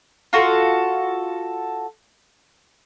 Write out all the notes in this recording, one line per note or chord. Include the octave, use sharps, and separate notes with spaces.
F4 F#4 A4